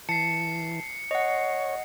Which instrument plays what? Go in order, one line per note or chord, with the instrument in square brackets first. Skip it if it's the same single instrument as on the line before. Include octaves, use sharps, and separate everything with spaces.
[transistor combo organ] E3 [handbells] A5 [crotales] C7 C#7
[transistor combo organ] C#5 [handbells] D#5 F#5